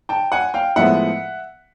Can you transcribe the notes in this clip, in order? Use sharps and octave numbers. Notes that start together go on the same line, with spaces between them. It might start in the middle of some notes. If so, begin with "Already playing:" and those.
G5 A5
F#5 G#5
F5 G5
A2 F3 G#3 B3 E5 F#5